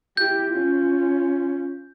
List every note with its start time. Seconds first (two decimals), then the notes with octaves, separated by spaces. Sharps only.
0.17 E4 G4 G6
0.52 C#4 F4